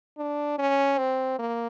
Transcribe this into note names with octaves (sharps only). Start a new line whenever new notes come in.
D4
C#4
C4
A#3